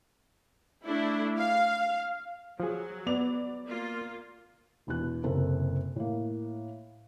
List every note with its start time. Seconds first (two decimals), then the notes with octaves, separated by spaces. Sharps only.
0.84 A3 D4 E4
1.37 F5
2.60 F3 F#3 G#4
3.07 B3 D5 F7
3.68 A#3 F4
4.87 E1 E2 B2 F#6
5.24 F#1 C3 C4 A4 A#4
5.96 A2 A#3